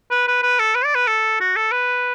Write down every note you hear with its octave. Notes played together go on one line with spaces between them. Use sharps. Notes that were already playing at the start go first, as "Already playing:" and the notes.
B4
B4
B4
A4
B4
D5
B4
A4
F#4
A4
B4